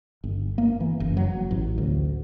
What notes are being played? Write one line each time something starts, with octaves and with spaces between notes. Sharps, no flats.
G1
A#3
E3
F#1
F#3
A1
D2